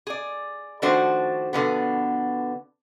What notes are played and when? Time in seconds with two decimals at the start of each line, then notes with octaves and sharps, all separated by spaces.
0.07 G#4 D5
0.82 D#3 F3 A3 D4 F#4 C5
1.53 B2 D3 F3 B3